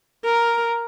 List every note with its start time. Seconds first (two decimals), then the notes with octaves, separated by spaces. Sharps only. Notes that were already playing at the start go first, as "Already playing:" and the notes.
0.25 A#4